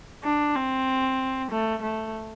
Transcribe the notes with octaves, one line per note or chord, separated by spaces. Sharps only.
D4
C4
A3
A3